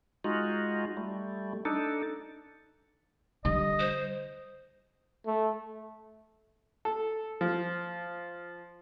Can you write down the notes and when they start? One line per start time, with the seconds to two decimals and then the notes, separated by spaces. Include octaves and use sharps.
0.24 G#3 D#4 F4 F#4
0.97 G3 A3
1.65 D4 D#4 A4
3.45 D3 G3 D#5
3.80 C5
5.26 A3
6.85 A4
7.41 F3